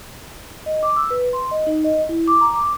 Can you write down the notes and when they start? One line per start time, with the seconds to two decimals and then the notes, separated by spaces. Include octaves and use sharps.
0.66 D#5
0.83 D6
0.96 E6
1.11 B4
1.33 C6
1.51 D#5
1.67 D#4
1.84 D#5
2.09 E4
2.28 D6
2.41 A#5
2.54 D6